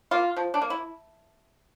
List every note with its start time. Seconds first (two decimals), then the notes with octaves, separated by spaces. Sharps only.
0.11 A#3 F4
0.37 F3
0.54 D4
0.62 A#3
0.70 E4